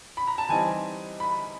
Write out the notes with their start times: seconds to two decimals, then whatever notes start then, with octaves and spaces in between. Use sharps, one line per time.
0.17 B5
0.27 A#5
0.38 A5
0.49 E3 G3 C4 D#4 G#5
1.20 B5